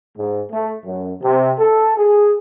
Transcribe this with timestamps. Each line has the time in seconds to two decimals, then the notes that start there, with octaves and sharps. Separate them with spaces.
0.16 G#2
0.52 A3
0.84 F#2
1.22 C3
1.58 A4
1.97 G#4